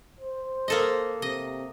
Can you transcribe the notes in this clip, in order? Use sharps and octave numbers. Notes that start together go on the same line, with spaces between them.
C5
A#3 A4 D#5
C3 D#5